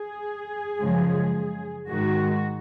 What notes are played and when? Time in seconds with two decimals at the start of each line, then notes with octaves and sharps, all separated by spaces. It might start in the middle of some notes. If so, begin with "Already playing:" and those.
Already playing: G#4
0.79 F#2 C#3 F3 G#3
1.88 G#2 D#3 G#3 F#4